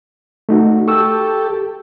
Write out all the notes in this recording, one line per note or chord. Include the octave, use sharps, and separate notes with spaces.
A3 D#4 F#4
G4 A4 C#6 E6